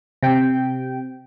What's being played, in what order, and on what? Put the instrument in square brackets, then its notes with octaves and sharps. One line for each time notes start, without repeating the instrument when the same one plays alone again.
[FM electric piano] C3 G5